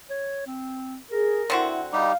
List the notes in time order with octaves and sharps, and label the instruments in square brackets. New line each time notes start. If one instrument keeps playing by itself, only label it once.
[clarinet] C#5
C4
[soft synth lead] G#4 [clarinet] A#4
[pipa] D3 C4 F#4 [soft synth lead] E4
[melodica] G3 D#4 G4 [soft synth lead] F5 [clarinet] B5